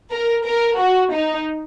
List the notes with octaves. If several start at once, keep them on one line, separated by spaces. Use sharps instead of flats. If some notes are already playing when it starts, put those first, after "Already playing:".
A#4
A#4
F#4
D#4